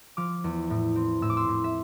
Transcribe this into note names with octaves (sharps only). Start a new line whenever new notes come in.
F3 D6 F6
E2
A2
C4
A2 E6
D6
C6 E6
A2
E5